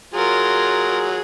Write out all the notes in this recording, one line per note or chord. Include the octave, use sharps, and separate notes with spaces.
F#3 F4 G#4 A#4